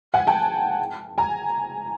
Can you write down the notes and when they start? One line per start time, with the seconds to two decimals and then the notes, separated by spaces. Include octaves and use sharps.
0.14 F#5 G#5
0.27 G5 A5
1.18 G#5 A#5